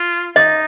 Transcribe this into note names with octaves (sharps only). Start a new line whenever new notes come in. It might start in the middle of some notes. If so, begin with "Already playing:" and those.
Already playing: F4
D#4 D#5